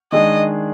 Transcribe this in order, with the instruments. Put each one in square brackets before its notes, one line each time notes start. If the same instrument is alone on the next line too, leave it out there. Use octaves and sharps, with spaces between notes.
[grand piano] D#3 G#3 D4 G#4 [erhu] D#5